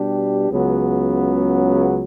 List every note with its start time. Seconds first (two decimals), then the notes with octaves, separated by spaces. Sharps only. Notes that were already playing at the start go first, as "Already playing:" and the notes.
Already playing: B2 G3 D4 G4
0.50 C#2 C#3 F#3 B3